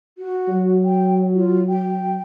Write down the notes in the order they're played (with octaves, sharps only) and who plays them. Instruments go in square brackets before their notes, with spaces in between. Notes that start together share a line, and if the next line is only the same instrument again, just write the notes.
[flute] F#4
[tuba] F#3
[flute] G5
F4
G5